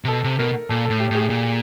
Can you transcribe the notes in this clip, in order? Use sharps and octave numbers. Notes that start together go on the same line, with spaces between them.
C3
B2 A4
C3
B2 A#4
A#2 A4
A2 A4
G4
A2 G#4
A#2